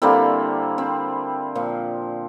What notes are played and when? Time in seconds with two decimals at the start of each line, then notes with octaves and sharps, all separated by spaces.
0.02 D3 G3 A#3 C4 E4
0.78 C4
1.55 A#2 F3